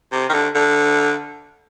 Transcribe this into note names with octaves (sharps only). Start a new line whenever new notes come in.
C3
D#3
D3
D3